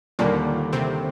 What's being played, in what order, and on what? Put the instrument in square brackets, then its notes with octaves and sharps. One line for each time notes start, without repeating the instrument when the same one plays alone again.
[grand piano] D#2 D3 G3 D4 [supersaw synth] A#2 A#3
[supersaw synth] C3 C4